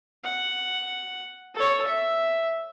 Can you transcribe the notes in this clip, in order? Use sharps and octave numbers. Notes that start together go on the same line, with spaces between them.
F#5
A4 C#5
E5